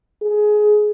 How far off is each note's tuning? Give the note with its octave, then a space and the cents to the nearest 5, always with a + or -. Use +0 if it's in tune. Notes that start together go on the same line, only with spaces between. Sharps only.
G#4 +20